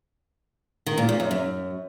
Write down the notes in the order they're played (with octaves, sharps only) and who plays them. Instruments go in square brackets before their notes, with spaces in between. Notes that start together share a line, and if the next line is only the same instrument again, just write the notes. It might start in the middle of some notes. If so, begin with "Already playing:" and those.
[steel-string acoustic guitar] D#3
A#2
A#2
F#2
F#2